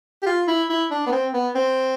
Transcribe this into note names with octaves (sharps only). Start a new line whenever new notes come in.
G4
F4
E4
E4
D4
B3
C4
B3
C4